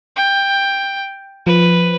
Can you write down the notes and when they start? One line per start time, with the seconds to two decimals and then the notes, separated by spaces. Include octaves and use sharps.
0.16 G5
1.47 F3 B4